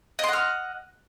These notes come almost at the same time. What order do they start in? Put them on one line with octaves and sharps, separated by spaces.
D#5 C6 F#5 F6